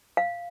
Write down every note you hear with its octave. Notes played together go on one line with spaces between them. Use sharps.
F5